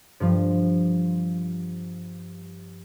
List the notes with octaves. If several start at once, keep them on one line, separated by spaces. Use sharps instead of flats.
G2 F3